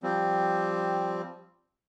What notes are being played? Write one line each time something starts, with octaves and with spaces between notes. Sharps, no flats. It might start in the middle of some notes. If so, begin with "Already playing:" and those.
F3 G3 C4